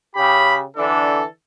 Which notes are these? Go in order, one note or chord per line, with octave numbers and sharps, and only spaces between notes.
C#3 G4 B5
D3 E3 D4 A4